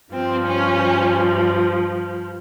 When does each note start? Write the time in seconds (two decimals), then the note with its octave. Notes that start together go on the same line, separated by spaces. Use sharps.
0.12 G2 F3 C4
0.45 C#4